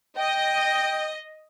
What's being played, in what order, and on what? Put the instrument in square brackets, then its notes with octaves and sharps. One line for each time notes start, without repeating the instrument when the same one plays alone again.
[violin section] D#5 [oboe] G5